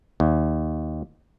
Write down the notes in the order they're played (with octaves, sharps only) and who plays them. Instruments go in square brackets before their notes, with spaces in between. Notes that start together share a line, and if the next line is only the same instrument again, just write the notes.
[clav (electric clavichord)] D#2